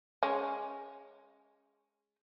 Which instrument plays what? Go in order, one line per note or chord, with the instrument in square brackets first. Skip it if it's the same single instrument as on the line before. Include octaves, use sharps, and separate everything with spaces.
[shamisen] G#3 C#4